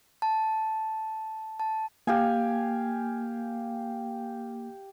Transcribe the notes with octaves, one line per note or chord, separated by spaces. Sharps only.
A5
A5
A#3 G4 F5 G#5